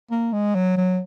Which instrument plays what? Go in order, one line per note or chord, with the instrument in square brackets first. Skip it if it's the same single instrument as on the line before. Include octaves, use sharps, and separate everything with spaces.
[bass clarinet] A#3
G#3
F#3
F#3